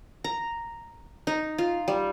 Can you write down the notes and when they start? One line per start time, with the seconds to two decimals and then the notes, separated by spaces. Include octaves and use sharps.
0.24 A#5
1.27 D#4
1.58 F4
1.88 G3